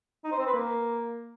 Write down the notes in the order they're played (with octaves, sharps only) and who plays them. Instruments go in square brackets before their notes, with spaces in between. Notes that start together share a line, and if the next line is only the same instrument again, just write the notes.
[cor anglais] D#4
C5
C4
B4
A#3